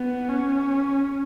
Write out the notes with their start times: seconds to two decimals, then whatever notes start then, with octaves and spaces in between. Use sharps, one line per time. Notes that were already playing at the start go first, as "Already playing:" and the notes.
Already playing: B3
0.29 C#4